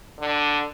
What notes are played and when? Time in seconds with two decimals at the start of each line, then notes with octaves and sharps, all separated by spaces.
0.20 D3